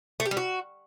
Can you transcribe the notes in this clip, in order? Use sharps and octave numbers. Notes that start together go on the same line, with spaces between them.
A3
G4
G3
F#4